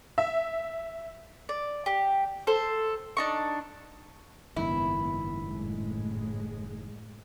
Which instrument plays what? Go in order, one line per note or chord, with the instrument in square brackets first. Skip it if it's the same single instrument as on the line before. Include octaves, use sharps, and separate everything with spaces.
[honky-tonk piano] E5
[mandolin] D5
G4
A4 C5
D4 D#4 C#6
[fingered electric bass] F#1 G#2 D#3 [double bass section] B3 [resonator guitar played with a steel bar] E4
[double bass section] A2 G#3